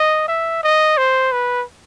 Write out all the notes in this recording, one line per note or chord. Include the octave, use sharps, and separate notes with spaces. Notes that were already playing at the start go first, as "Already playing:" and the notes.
Already playing: D#5
E5
D#5
C5
B4